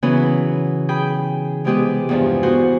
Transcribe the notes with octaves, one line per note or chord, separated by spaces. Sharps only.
C#3 E3 F#3 B3 C#4 B4
G#4 G5 B5 G6
C3 G#3 B3 G4 G#4 B4
E2 G2 F3
B3 F#4 G#4 C5